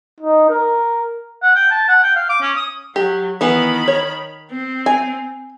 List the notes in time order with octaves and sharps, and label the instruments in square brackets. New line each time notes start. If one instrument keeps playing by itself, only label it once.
[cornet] D#4
A#4
[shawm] F#5
G5
A5
F#5
G5
F5
D6
C#4
D#6
[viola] F#3 [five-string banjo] G4
[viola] D#3 B5 [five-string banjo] E3 B3
[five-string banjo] C#5
[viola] C4
[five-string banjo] G#5